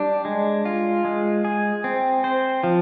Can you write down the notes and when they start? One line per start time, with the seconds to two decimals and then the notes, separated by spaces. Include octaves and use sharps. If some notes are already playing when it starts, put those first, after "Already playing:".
Already playing: G3 D4
0.25 G#3
0.65 F4
1.05 G#3
1.45 G#4
1.84 C4
2.24 C5
2.64 F3